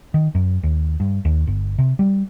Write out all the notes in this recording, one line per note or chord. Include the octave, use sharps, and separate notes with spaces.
D#3
F#2
D#2
G2
D#2
G1
C3
G3